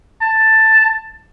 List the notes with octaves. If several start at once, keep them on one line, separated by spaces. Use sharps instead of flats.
A5